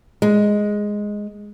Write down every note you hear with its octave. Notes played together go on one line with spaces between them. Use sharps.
G#3